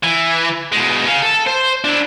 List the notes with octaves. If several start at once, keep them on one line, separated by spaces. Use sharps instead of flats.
E3
B2 G#3
G#4 F5
A4
C5
D4 E4